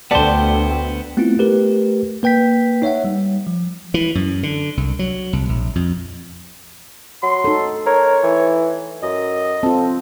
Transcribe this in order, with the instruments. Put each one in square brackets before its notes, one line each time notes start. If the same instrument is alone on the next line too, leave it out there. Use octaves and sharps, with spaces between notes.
[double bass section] D2 [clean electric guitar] B3 C5 [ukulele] A4 D5 A5 [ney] G5
[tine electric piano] A3 B3 C4 E4 F4
A3 G4 A#4 B4
A#3 B4 G5 G6 B6
D#4 C#5 E5 F#5
G3
F3
[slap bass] E3
F#2
D3
C2
F#3
C2
A#1
F2
[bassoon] F#3 [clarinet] C6
[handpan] D#4 A4
[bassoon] A#4 [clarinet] C#5
[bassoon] E3
[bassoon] F#2 [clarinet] D#5
[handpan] C4 F4 [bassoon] A4